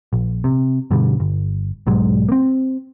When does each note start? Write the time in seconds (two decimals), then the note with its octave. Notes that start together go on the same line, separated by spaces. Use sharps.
0.13 A#1
0.44 C3
0.91 G2 B2 D3 G3
1.20 G1
1.87 B1 G#2 F#3 G#3
2.29 A#3 C4